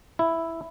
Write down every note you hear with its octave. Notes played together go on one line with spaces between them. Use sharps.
E4